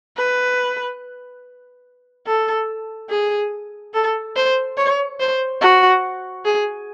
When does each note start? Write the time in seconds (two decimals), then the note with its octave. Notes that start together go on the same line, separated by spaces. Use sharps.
0.17 B4
2.27 A4
3.10 G#4
3.94 A4
4.36 C5
4.77 C#5
5.20 C5
5.61 F#4
6.45 G#4